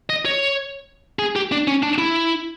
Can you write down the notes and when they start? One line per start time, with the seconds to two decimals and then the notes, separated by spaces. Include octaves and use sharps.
0.10 D#5
0.26 C#5
1.19 G#4
1.36 G4
1.52 D4
1.68 C#4
1.83 D4
1.98 E4